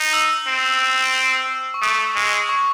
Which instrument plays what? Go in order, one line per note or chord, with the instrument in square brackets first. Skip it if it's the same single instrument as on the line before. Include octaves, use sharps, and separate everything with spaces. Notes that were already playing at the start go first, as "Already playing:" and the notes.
Already playing: [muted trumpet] D#4
[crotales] E6
[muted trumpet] C4
[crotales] C#6
[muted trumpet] A3 [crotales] D#6
[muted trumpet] G#3
[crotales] C#6